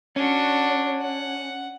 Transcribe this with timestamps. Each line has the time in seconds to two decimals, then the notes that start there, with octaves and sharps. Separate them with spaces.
0.16 C#4 D4 F#4
1.01 F#5